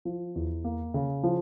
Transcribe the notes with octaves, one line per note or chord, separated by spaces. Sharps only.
F3
E2
A#3
C#3
F3